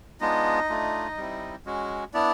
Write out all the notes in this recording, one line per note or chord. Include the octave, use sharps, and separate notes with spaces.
G#3 B3 D4 D#4 F4 D#5
A3 D4 F4
G3 C4 E4
G#3 C#4 F#4
B3 D4 E4 D5